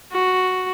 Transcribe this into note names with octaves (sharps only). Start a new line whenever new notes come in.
F#4